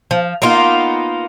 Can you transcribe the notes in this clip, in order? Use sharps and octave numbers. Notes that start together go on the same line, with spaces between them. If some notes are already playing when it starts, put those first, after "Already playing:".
F3
A#3 B3 D#4 F4